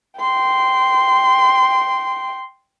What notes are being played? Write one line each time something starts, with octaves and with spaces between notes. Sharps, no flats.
G5 C6